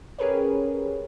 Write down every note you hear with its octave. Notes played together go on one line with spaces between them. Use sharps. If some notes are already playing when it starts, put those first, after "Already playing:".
C#4 G4 G#4 A#4 B4 C#5